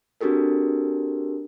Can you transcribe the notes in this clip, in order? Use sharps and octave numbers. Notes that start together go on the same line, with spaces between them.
C4 D4 F#4 G4 A4 A#4